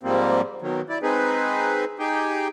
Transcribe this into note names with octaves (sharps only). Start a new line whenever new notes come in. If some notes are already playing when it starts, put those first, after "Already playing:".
G#2 F3 G3 A#3 C4
B2 D#3 F#3
E4 D5
G#3 C4 D#4 G#4 B4
D#4 G4 G#4 G5